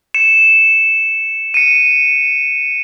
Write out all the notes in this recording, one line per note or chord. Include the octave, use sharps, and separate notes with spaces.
C#7 E7
C#7 D#7